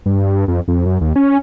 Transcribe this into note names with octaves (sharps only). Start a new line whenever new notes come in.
G2
F2
F2
F#2
D#2
C#4